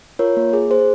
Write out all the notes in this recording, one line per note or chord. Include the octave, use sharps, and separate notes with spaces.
F4 A#4 C#5
A#3
G#4
G#4 C5